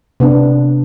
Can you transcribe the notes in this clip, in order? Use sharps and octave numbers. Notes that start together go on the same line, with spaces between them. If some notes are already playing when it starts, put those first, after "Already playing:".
C3 B3 D4